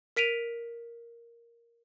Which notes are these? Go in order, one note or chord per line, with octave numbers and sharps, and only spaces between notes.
A#4 B6 D7 D#7 F7